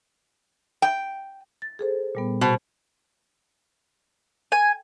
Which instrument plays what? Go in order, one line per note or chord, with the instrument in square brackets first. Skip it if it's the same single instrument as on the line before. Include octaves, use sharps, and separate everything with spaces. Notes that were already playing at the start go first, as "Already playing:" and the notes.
[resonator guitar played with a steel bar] G5
[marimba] A6
G#4 A4 C5
A#2 G3 B3
[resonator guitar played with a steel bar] B2 [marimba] C5
[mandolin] G#5